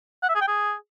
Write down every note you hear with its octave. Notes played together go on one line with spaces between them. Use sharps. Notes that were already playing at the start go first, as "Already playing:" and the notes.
F#5
E5
G#4
G5
G#4